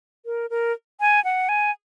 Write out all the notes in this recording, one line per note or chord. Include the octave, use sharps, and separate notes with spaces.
A#4
A#4
G#5
F#5
G#5